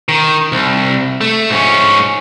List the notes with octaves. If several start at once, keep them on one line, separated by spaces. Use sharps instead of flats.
D#3
C2
A3
G#2 C#4